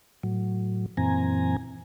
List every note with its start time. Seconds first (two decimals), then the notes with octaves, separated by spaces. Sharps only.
0.23 A2 F#3
0.97 F#2 A#2 E3 C4 G#5 A#5